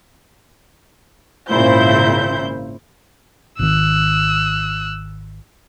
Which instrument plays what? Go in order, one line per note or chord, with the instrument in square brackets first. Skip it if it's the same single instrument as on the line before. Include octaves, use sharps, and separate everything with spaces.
[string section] G#1 A#2 C#3 E4 C5 G6
[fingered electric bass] G#1 D#3 [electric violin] E6 F#6